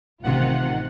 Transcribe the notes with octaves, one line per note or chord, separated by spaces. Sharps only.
A1 C3 D#3 F4 F#5